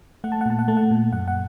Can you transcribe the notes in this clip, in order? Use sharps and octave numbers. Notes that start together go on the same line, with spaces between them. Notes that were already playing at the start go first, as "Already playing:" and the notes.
A3 F#5
A5
F#5
A#2 A5
F#5
A3 A5
F#5
A#2
F#2 F#5
F#5